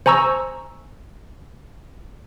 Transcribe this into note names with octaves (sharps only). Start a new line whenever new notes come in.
C5 G#5 A#5 C#6 E6